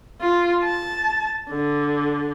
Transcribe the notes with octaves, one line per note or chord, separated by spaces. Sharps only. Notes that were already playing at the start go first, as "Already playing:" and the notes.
F4
A5
D3